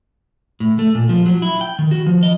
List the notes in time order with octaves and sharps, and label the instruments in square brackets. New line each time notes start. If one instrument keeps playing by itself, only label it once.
[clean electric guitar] A2
A3
A#2
F3
F#3
E4
G5
D#3
F#4
F3
D#5